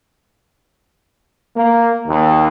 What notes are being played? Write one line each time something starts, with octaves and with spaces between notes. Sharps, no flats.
A#3
D#2